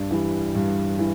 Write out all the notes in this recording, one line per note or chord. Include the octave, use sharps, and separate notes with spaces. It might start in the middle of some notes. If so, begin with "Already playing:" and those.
Already playing: G2 D4
E3 G3
G2
E3